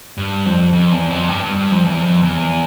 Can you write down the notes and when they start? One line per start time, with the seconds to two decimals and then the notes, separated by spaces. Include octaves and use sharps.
0.18 G2
0.46 F2
0.73 F2
0.92 E2
1.10 F2
1.29 G2
1.43 G2
1.56 G2
1.71 F2
1.85 E2
2.03 F2
2.23 E2